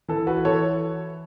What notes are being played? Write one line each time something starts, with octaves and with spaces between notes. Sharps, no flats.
E3 A4
F#4 B4
E3 A4 C#5